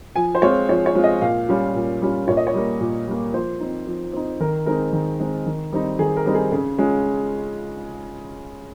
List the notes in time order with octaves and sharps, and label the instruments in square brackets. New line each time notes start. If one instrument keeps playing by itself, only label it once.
[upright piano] F3 G#5
C5
G#3 C4 F4 C#5
F3 C#5
C#5
G#3 C4 F4
D#5
A#2 F5
G3 C#4 F4
A#2
G3 C#4 F4
A#2 C#5
D#5
C#5
G3 A#3
A#2
G3 A#3
F3 C5
C4 D#4
F3
C4 D#4
D#3 A#4
G#3 C4 D#4 A#4
D#3
G#3 C4 D#4
D#3
G3 C4 D#4
D#3 G#4
A#4
G3 C4 D#4
G#4
C#3 G#4
G#3 C#4 F4